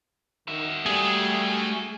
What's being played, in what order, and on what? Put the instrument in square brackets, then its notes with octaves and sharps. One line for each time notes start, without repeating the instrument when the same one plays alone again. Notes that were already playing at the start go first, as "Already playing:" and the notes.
[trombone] D#3 [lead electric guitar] F#4 E5
[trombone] G3 [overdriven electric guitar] A3 [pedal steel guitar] G#4